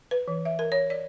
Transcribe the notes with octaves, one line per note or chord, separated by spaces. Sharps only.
B4
E3
E5
A#4
C#5
D5